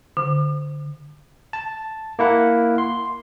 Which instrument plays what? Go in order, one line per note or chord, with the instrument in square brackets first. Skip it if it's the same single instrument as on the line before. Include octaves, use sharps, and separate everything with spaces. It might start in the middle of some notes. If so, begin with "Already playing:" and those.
[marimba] D3
[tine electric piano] A5
A#3 E4 F#5
C6